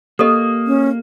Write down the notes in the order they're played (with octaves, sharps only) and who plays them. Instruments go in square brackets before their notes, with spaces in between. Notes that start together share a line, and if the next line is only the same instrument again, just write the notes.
[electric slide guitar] A#3 [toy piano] G4 A4 D#5 [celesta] D#6
[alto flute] C#4